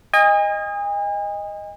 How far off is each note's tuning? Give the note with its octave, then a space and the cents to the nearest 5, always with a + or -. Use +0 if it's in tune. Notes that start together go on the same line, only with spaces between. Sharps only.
D#5 +0 G#5 -40